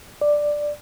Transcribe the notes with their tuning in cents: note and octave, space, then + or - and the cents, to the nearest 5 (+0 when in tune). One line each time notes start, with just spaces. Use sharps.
D5 +5